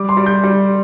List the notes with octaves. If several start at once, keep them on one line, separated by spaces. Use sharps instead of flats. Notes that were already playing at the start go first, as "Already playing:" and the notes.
Already playing: G3 D6
C6
G3
G6
G3